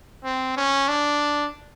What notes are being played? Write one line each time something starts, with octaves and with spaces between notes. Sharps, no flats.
C4
C#4
D4